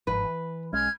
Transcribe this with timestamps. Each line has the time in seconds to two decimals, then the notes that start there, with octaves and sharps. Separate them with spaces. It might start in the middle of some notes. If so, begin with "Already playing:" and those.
0.07 G1 G#2 F3 B4
0.25 E3
0.73 B1 G#3 C#4 F6 G#6